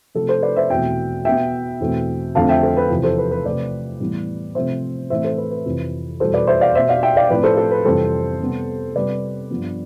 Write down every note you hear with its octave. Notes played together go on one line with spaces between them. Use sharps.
C3 F3 A3 C4 A4
A4 C5
B4 D5
C5 E5
E2 B2 A3 C4 E5 G5
B2 B3 E5 G5
E2 B2 A3 C4
F2 D3 F3 A3 C4 F5 A5
E5 G5
A4 C5
B4
E2 C3 F3 C4
A4 C5
B4
B4
C3 F3 A3 C4 B4 D5
A2 E3 G3 B3
C3 F3 A3 C4 C5 E5
A2 E3 A3 C4 C5 E5
A4 C5
B4
B4
F2 C3 E3
E2 B2 G3 A4 C5
B4 D5
C5 E5
D5 F5
B2 B3 C5 E5
D5 F5
E5 G5
D5 F5
A2 F3 C4 B4 D5
A4 C5
A4
B4
F2 C3 E3 G3 C4 A4 C5
C3 G3 B3
C3 G3 C4 B4 D5
G2 F3 B3